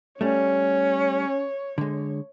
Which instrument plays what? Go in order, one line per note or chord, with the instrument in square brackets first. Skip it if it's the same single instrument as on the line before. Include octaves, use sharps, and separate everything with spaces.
[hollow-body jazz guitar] G3 A3 [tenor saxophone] C#4 [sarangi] C#5
[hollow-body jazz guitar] D3 G#3